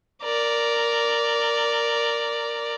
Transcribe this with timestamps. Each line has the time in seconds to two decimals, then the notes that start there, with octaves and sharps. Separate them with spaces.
0.23 A#4 D5